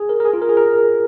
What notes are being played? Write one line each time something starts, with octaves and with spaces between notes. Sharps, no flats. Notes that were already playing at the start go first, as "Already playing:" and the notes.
Already playing: G#4
A#4
A#4
G#4
F4
A#4
G#4
A#4